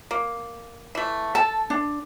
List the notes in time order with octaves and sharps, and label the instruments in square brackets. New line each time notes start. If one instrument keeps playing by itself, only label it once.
[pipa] A#3
E3 A3
[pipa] A4 [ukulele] A5
[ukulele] D4